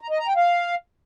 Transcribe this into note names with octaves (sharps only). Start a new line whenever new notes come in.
A#5
D#5
A#5
G5
F5